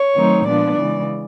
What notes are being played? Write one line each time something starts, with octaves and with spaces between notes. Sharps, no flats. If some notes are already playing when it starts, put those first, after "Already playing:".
Already playing: C#5
D#3 F#3 A3 C4 D#4
A#2 F3 G#3 B3 D4 D5
C#3 E3 G#3